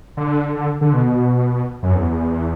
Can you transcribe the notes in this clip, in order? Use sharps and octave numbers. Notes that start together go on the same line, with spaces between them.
D3
D3
D3
B2
F#2
E2